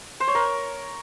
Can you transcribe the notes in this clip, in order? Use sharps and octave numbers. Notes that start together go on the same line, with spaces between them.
C5
C#5
A#4